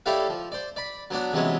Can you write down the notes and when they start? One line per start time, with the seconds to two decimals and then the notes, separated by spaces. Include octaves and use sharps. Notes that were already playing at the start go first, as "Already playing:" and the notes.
0.06 A3 E4 G4 C#5 D5 F5
0.29 F3
0.52 C5 D5
0.76 D5 B5
1.10 F#3 B3 D4 F#4
1.33 C3 E3 F#3 G#3 B3 C#4